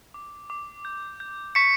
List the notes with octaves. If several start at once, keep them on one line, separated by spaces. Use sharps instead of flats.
D6
D6
G6
G6
C#6 B6 C#7